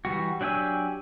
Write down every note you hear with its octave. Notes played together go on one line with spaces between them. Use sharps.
E3 G3 F#4
F#3 D4 G4 G#5 E6